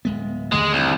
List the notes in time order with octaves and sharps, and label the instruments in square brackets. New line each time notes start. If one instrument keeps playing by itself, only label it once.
[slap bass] D1 G#3 B3
[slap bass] D#2 D3 A3 [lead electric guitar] G#3
[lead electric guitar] C2